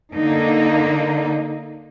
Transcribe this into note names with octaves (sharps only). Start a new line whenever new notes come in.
D3 A#3 D#4